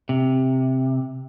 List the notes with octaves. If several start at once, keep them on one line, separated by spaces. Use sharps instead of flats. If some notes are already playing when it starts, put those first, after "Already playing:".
C3